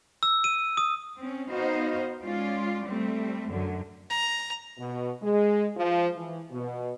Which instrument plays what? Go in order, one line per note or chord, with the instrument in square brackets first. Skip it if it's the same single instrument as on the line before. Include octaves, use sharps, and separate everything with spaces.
[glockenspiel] E6
D#7
D#6
[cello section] C4 C#4
B3 D#4 F#4 C5 D#5 F5
G#3 C#4 F4 D5
G3 A3 C4
F#2 D3 F#3
[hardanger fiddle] A#5
[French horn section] B2
G#3
F3
E3
B2